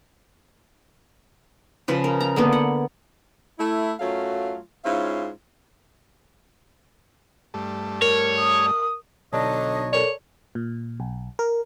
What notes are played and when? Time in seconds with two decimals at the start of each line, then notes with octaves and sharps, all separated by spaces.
1.88 C#3 F3 B4
2.04 A#4
2.20 A#5
2.36 D3 A#3 B3
2.53 F#5
3.59 A3 E4
4.00 F#2 F#3 A3 F4 F5
4.84 G#2 C#4 E4 F4 F5
7.54 G2 A3
8.02 A#4 C#5
8.39 D#6
9.33 B1 B2 D3 D4 D#4 C#5 D#5
9.93 A4 A#4 C#5 D5
10.55 A#2
11.00 B1
11.39 A#4